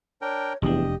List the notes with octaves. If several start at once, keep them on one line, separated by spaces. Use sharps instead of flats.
D4 A#4 C#5 G5
F1 E2 D4 G4 D#5